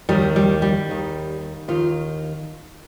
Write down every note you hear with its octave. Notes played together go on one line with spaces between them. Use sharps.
D#2 D#3 G3
G3
G3
D#2 D#3
D#2 D#3 F4